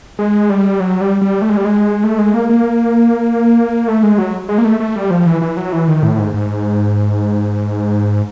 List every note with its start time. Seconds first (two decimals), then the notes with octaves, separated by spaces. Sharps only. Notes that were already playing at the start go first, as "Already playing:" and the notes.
0.19 G#3
0.50 G3
0.80 F#3
1.01 G3
1.22 G3
1.42 A3
1.49 G#3
1.57 G3
1.65 G#3
2.04 A3
2.19 G#3
2.34 A#3
2.50 A#3
3.88 A3
4.03 G#3
4.18 F#3
4.49 G#3
4.58 A#3
4.65 A3
4.80 A3
4.96 G3
5.10 F3
5.26 E3
5.42 E3
5.57 F#3
5.73 E3
5.88 D#3
6.03 A2
6.18 G#2
6.34 G#2